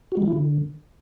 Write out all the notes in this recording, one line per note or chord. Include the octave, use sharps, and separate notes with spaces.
F#4
G#3
E3
E4
D3